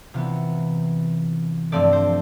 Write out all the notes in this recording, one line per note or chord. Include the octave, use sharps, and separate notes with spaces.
C3 E3 B3 F4
G2 F3 A3 C4 D5
C5